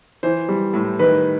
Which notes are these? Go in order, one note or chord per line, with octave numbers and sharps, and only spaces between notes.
E3 C5
G3
A2
D#3 B4